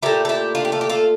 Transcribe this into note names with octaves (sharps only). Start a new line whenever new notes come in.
A#2 A3 E4 G4
A4
E4 G4
D4 F4
G4
F4 A4
G4
F4 A4